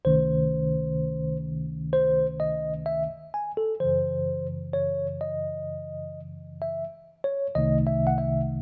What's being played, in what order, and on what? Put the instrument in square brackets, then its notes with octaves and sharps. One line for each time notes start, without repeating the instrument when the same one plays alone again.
[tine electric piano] C#2 C3 D#3 A3 C#4 C5
C5
D#5
E5
G#5
A4
F#2 C#3 E3 C5
C#5
D#5
E5
C#5
C2 C3 D#3 A3 D#4 D#5
E5
F#5
E5